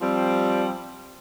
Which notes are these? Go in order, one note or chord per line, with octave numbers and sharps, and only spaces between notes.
F3 G3 C4